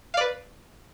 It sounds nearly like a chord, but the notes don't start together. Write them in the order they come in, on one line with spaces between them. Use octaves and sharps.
F5 D5 B4